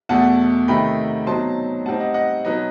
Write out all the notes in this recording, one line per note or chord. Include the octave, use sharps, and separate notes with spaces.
E2 B2 A3 F#5 A5
C3 D#3 A3 D#4 G5 B5
B2 F#3 C4 D#4 A5 C6
A2 G3 C4 D#4 F#5 A5
D#5 F#5
D#5 F#5
B2 F#3 B3 D#4